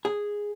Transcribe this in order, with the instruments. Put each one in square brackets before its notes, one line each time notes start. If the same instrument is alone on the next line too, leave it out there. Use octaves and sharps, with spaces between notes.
[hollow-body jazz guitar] G#4